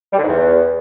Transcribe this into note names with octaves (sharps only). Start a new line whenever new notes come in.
G3
D3
G#2
E2